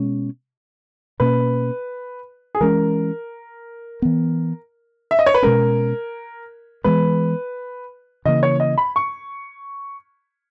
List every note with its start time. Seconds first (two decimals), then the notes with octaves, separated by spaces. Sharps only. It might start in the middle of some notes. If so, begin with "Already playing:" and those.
Already playing: B2 G#3 C#4
1.20 B2 A#3 C#4 B4
2.55 G#4
2.60 E3 G#3 C#4 A#4
4.02 E3 B3
5.11 E5
5.19 D#5
5.26 C#5
5.34 B4
5.42 B2 G#3 C#4 A#4
6.84 E3 G#3 B3 B4
8.25 C#3 E3 A#3 D#5
8.43 C#5
8.60 D#5
8.78 B5
8.96 C#6